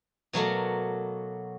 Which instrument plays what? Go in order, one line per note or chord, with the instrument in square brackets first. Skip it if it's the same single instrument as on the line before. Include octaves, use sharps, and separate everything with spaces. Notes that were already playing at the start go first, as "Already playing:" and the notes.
[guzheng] B2 F#3 A3 A#3